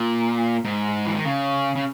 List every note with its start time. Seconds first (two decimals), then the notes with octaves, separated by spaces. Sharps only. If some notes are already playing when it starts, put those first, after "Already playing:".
Already playing: A#2
0.65 G#2
1.06 E3
1.15 D#3
1.25 C#3
1.76 C#3